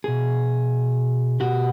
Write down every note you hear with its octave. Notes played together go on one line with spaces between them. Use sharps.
B2 G#4
B2 F#4 G4